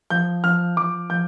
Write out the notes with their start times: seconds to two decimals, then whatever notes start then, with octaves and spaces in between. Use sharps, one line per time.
0.10 F3 G6
0.44 F3 F6
0.77 F3 D6
1.10 F3 G6